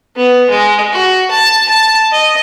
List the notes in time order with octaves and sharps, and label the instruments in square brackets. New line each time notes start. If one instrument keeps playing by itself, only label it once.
[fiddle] B3
G#3
F#4
A5
A5
D#5